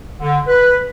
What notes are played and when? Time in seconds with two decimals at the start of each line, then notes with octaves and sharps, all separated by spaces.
0.20 D3
0.47 B4